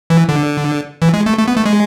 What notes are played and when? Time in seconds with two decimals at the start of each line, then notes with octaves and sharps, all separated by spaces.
0.10 E3
0.29 D3
1.02 E3
1.14 G#3
1.26 A3
1.38 A3
1.48 B3
1.56 A3
1.65 G#3